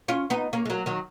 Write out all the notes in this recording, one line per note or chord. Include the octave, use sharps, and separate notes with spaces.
C#4 F4
B3 D#4
A#3 C#4
G#3
F#3 A#3
D#3 F#3